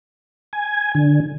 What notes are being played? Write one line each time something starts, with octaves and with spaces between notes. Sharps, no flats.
G#5
D3